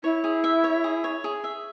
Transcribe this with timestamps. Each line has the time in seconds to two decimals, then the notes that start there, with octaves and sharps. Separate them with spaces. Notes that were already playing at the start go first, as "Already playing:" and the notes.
0.04 E4 C#5
0.24 G#4
0.44 E5
0.64 C#5
0.84 G#4
1.04 C#5
1.24 G#4
1.44 E5